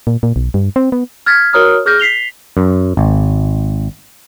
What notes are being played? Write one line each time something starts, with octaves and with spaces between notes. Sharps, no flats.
A#2
A#2
B1
G2
C4
B3
F6 G#6 A6 B6
F#4 A#4 C#5 A#5 D#6 F6
G#4 F6 G6 A#6
B6 C7 F7 G7
F#2
G#1